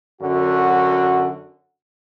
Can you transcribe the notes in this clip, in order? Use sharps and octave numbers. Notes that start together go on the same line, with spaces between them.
F#2 D3 F#4